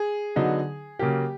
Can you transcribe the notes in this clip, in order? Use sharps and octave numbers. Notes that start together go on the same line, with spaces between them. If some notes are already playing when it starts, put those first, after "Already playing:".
Already playing: G#4
D3 F#3 B3 D#4
C#3 F#3 A#3 G4